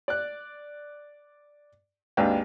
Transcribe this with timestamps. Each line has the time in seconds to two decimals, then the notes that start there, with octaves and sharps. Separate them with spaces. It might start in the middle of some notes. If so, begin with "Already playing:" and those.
0.08 D5 F#6
2.17 G#1 D#2 D4 B4 F5 G5